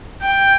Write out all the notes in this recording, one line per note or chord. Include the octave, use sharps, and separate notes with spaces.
G5